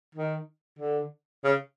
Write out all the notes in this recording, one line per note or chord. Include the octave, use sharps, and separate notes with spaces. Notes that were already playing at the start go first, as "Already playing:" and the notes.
D#3
D3
C#3